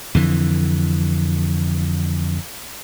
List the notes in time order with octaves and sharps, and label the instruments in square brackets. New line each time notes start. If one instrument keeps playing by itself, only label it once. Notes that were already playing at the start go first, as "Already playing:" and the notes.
[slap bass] F2 D3 E3